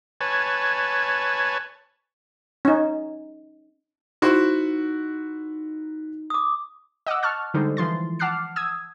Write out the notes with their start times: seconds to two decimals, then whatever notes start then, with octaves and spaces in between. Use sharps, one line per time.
0.21 B4 C#5 G#5 A5
2.65 C#4 D#4
4.22 D#4 E4 F#4 C5
6.30 D6 D#6
7.07 D#5 F#5 D6 E6
7.23 A5 C#6 F6 F#6 A6
7.54 D3 G3 G#3 D#4 A4 C5
7.77 E3 F3 C6 A6
8.19 F#5 A5 D6 F6 F#6 C7
8.56 D#6 E6 G#6